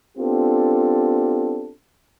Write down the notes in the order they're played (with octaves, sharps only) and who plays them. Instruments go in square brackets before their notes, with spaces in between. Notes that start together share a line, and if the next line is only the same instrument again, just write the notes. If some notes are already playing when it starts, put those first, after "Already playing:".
[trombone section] B3 C4 D4 F4 G4 A4